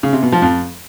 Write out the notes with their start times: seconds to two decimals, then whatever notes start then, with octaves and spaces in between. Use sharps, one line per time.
0.03 C#3
0.13 C3
0.23 B2
0.32 F3
0.42 F2